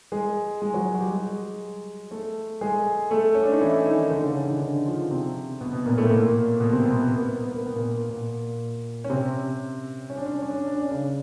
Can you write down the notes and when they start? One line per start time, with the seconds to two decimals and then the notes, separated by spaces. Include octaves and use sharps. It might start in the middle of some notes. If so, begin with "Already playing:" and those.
0.12 G#3 G#4
0.62 G#3 G#4
0.74 F#3 F#4
0.95 F#4
0.99 G3 G4
1.11 G#3 G#4
2.11 A3 A4
2.61 G#3 G#4
3.11 A3 A4
3.34 C#4
3.43 D4
3.52 D#4
3.61 E3 E4
3.86 D#3 D#4
4.06 D#4
4.10 D3 D4
4.23 C#3 C#4
4.36 D3 D4
4.49 D#3 D#4
4.61 D3 D4
4.86 F3 F4
5.11 C3 C4
5.61 B2 B3
5.73 B2 B3
5.86 A#2 A#3
5.97 A2 A3
6.10 A#2 A#3
6.60 B2 B3
6.73 C3 C4
6.85 B2 B3
6.98 A#3
7.08 B3
7.17 A#3
7.27 B3
7.37 A#3
7.47 B3
7.56 A#3
7.66 B3
7.76 A#2 A#3
8.10 A#2 A#3
9.04 C#4
9.10 C3 C4
10.10 C#4
10.17 D4
10.26 C#4
10.34 D4
10.42 C#4
10.50 D4
10.59 C#4
10.66 D4
10.75 C#4
10.82 D4
10.91 C#3 C#4